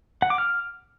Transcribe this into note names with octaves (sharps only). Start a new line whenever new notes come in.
F#5
D6
F6